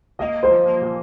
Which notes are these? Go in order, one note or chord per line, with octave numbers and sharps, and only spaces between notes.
A#3 D#5
A#3
C5
F3
A#3
A#2